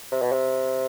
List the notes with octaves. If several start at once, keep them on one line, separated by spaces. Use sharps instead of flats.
C3
B2
C3